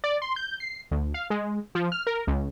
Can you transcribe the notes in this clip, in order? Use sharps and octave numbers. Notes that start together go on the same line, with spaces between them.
D5
C6
G6
C7
D2
F5
G#3
F3
F6
A#4
C#2